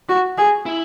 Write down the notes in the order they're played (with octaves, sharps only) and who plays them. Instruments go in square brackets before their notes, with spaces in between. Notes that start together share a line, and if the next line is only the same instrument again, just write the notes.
[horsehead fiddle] F#4
G#4
[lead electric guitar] E4